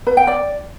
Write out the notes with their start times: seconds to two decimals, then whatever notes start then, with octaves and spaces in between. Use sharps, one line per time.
0.07 B4
0.17 G5
0.27 D5